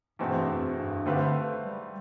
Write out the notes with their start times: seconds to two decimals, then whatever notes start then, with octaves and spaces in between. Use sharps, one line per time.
0.19 E2 G2 B2 A3 C4
0.48 F2
0.77 G2
1.06 D3 A3 C4 G4 B4 F5
1.62 G3